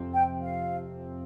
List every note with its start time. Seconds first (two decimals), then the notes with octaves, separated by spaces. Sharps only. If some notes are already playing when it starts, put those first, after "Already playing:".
Already playing: F2 C3 F3 C4
0.14 G5
0.42 F5